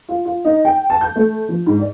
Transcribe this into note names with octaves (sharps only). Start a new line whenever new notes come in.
F4
F4
D#4
G5
A5
G6
A3
F3
G#2
D5